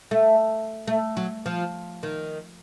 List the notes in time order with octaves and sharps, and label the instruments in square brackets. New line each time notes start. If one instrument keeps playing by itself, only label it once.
[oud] A3
A3
F#3
F3
D#3